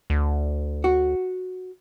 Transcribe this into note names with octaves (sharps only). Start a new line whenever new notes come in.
D2
F#4